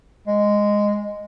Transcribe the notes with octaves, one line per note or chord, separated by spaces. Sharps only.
G#3